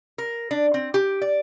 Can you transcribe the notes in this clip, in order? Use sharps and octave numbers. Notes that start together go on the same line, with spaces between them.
A#4
D4
C4
G4
D5